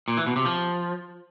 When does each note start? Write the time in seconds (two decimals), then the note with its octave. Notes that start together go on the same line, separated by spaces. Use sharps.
0.08 A#2
0.17 E3
0.26 B2
0.36 C3
0.45 F3